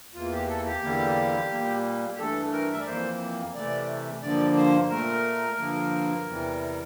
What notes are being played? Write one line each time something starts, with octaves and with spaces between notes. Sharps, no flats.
E2 E3 A#3 F4
G4
A4
G4
E2 D3 G3 A#3
A#2 G3 A#3
G4
G2 E3 A3 A4
A#4
E5
D5
F2 E3 A#3 C5
C3 E3 A3 D5
G2 D3 F3 A#3 D5
C5
A#2 A3 A#4
G2 D3 F3 A#3
E2 C3 E3 G3